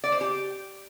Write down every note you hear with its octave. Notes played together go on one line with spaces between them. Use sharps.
D5
C5
G4